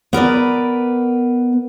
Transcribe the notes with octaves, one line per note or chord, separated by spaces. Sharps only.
B3 A#4 B4 D5